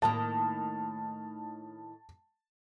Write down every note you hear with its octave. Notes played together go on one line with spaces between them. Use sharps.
A2 D#3 A#3 A5